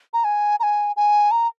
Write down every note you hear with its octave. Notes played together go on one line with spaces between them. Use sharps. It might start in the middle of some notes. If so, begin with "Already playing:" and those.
A#5
G#5
A#5
G#5
G#5
A#5